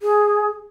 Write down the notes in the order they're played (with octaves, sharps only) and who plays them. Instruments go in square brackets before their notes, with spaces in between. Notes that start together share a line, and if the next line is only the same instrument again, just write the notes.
[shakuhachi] G#4